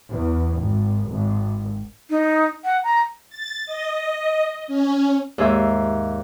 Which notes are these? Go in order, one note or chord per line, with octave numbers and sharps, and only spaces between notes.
E2
G#1
G#1
D#4
F#5
A#5
A6
D#5
C#4
D#2 G#2 G#4 C5 E5